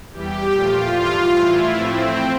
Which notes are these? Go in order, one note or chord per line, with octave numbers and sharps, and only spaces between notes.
E2 E3 G3 G4
A#2 F3 A3 F4
G2 E3 G3
A2 E3 A3 E4
A2 F3 A3 C4